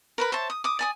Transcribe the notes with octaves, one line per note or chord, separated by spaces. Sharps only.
A#4 B4 B5
C5 C#5 E5 A5
D#6
D6 D#6
D5 G#5 D#6